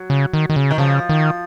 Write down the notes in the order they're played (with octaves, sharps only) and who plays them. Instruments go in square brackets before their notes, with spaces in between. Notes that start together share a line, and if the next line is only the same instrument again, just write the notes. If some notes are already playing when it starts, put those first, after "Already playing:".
Already playing: [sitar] F#3
[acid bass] C#3
D#3
D#3
C#3
[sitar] D#3
[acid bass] C#3 [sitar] F3
[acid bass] D#3